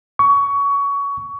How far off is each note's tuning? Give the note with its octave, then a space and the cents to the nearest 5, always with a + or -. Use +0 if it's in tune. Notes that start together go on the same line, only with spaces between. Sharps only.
C#6 +20